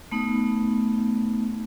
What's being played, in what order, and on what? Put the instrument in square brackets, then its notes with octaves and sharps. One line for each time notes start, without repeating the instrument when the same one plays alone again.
[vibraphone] A3 B3 D#4